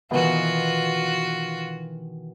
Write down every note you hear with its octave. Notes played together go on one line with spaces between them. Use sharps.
B2 D#3 E3 F4 F#4